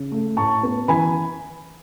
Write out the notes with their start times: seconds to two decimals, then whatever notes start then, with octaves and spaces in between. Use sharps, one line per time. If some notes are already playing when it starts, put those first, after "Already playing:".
Already playing: C#3
0.12 A3
0.37 A2 A5 C#6
0.63 B3
0.88 E3 G#5 B5